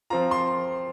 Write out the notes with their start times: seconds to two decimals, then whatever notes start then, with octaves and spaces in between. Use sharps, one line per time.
0.10 F3 C4 F4 A#5
0.31 C6